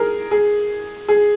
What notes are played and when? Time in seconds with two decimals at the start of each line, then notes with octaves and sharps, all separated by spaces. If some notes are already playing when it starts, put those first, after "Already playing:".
Already playing: G#4 A#4
0.31 G#4
1.09 G#4